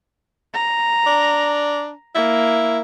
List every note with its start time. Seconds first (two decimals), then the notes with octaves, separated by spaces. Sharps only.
0.54 A#5
1.07 D4
2.15 A#3 E4